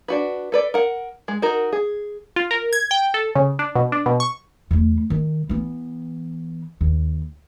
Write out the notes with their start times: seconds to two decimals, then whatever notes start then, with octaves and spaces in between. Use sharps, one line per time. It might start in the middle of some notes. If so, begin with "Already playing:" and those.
0.08 D4 F#4 B4
0.52 A4 B4 D5
0.74 A#4 F#5
1.28 G#3
1.42 D#4 F#4 A#4
1.73 G#4
2.36 F4
2.51 A#4
2.73 G#6
2.91 G5
3.14 A4
3.35 C#3
3.59 D4
3.75 B2
3.92 D4
4.06 B2
4.20 C#6
4.71 E2 A3
5.10 D#3
5.49 E3 B3
6.81 D#2